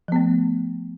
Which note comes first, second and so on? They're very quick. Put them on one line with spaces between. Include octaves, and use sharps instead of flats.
F3 B3 A3